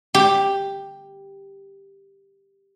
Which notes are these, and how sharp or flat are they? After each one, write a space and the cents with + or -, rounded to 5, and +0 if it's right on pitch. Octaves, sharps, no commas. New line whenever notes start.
G4 +5